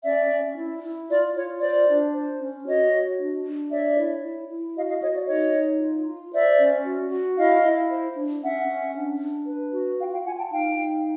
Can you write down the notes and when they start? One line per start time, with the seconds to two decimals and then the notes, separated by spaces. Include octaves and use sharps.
0.04 C#4 D5 E5
0.30 C#4
0.56 E4
0.83 E4
1.09 F4 D5
1.35 F4 C#5
1.61 C5 D5
1.88 D4
2.14 C5
2.40 C#4
2.65 F#4 C#5 D#5
2.92 F#4
3.18 D4
3.45 D4
3.70 C#5 D5 E5
3.97 E4
4.23 E4
4.49 E4
4.75 F#4 D#5 F5
4.88 D#5 F5
5.01 F#4 C#5 D#5
5.14 D5
5.27 D#4 C#5 D#5
5.54 D#4
5.80 F4
6.07 F4
6.32 C5 D5 E5
6.59 C#4
6.84 F#4
7.10 F#4
7.37 E4 D#5 F5
7.63 E4
7.90 C5
8.16 D4
8.42 C#4 E5 F#5
8.68 C#4
8.95 D4
9.20 D4
9.46 B4
9.72 F#4
10.00 F4 F5 G5
10.12 F5 G5
10.25 F4 F#5 G#5
10.38 G5 A5
10.51 D#4 F5 G5
10.77 D#4